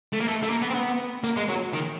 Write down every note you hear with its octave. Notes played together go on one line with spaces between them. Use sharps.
A3
A#3
A3
A3
A#3
B3
C4
B3
A#3
G#3
F#3
D#3